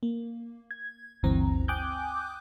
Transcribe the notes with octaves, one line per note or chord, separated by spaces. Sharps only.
A#3
G#6
G1 D2 G2 E3 C4 A#5
G5 G#5 D6 D#6 F#6 G6